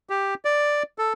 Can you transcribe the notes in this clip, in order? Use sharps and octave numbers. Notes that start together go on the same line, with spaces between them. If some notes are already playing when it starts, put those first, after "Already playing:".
G4
D5
A4